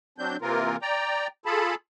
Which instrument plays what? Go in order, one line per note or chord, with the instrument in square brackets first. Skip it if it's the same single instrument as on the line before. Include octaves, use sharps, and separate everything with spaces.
[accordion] F#3 C4 D4 G6
C3 E3 A#3 C4 F4 A#4
D5 G5 A#5
F4 G#4 A4 A5 B5